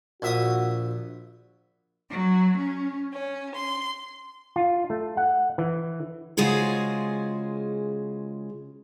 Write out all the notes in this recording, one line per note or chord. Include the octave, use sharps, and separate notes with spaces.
A#1 F#4 E5 D#6
F#3
C#4
C#4
C6
F4
A3
F#5
E3
C#3 G#3 F4 F#4 G#4 C5